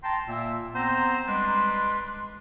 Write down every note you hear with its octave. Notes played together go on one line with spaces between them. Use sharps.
G5 A5 A#5 C6
A#2 A#3 E5 E6
B3 C4 C5 A#5
G3 G#3 D4 B4 C6